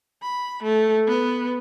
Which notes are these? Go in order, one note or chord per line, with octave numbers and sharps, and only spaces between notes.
B5
A3
B3